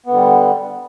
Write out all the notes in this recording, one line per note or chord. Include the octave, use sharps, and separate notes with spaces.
D3 G3 B3